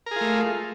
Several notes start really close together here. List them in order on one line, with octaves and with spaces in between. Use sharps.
A#4 G#4 F4 A3